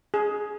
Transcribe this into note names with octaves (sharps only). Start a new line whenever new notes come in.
G#4